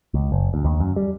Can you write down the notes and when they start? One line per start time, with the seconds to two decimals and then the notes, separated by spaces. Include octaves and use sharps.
0.14 C#2
0.32 F#1
0.54 D2
0.65 D#2
0.80 F#2
0.96 G3